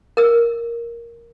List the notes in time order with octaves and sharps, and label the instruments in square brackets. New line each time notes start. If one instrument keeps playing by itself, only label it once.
[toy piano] A#4 E6